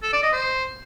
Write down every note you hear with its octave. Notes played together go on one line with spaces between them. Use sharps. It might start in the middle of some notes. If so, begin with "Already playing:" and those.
A4
D5
D#5
C5